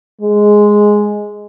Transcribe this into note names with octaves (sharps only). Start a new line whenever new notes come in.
G#3